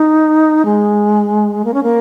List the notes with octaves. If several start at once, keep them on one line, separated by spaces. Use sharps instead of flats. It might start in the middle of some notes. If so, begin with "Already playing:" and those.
Already playing: D#4
G#3
A#3
C#4
A#3